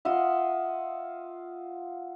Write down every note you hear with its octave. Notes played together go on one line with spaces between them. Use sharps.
F4 D#5 E5 F#5